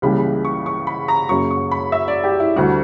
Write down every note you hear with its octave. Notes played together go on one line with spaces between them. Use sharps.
C#2 C#3 E3 G3 A#3 B5
C#6
C#6
B5
A#5
F#2 C#3 F#3 A#3 C#6
C#6
B5
E5
D5
G4
E4
D2 D3 G3 F#4